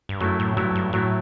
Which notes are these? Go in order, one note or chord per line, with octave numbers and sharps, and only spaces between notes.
G2
F#2 F#3 A3 E4
A2
G2 F#3 A3 E4
G2
A2 F#3 A3 E4